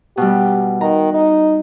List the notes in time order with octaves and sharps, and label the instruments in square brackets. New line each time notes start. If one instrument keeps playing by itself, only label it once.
[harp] B2 G3 [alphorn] G4
[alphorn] D#3 [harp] A#5
[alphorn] D#4